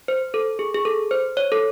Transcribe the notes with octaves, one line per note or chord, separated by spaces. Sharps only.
C5
A4
G#4
G#4
A4
C5
C#5
A4